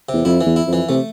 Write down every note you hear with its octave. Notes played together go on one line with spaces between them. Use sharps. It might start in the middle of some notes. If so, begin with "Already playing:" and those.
E2 C3
F2 E4
E3
E2
E4
F2
E3
C3 A3